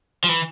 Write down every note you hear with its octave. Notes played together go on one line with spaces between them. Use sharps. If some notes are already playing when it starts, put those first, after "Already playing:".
F3
E3